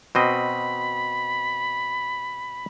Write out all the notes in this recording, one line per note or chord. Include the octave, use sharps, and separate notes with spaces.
B2 C4 D#5 B5